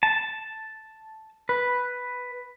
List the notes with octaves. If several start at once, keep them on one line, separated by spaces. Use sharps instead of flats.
A5
B4